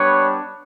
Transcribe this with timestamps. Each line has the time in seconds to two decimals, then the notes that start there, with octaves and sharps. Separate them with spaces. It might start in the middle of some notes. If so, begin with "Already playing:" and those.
Already playing: G3 B3 D4 B4 C#5